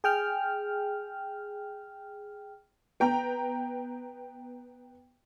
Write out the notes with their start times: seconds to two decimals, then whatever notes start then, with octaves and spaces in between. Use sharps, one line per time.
0.04 G#4 G5 F6
3.00 B3 G5 A#5